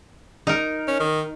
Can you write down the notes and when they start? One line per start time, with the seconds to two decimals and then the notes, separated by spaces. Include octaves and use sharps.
0.47 D#4 A#4
0.87 C#4
1.00 D#3